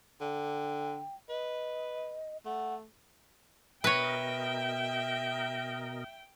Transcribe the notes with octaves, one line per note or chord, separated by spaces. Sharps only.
D3 G5
B4 D#5
A3 F#5
B2 A#4 B4 C#5 D#5 E5 G5